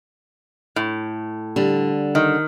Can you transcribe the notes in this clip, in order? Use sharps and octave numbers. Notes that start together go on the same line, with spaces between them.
A2
D3 G3
D#3